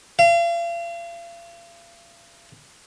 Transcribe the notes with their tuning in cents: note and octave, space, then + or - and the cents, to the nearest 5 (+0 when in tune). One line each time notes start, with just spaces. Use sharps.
F5 -40